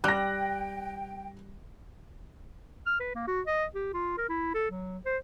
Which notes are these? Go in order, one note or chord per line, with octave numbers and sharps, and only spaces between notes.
G3 G5 F#6 A#6
F6
B4
A#3
F#4
D#5
G4
F4
A#4
E4
A4
F#3
C5